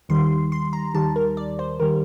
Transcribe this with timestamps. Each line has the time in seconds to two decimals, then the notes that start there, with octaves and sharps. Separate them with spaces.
0.09 D#2 D#3 G3 C6
0.52 C6
0.73 A#5
0.94 D#2 D#3 G3 A5
1.16 A#4
1.37 D5
1.59 C5
1.80 D#3 G3 A#4